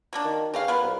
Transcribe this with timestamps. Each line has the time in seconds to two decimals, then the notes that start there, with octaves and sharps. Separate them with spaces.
0.13 F#3 A#3 D4
0.25 D#3
0.54 E2 C4 C#4 F5
0.68 B3 F4 A#4 B4
0.83 C2